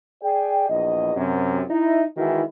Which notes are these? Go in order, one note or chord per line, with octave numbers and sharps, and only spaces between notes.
G#4 D5 G5
A#1 E2 D#5
F#2 C3
D#4 E4
D#3 E3 G#3 E4 F#4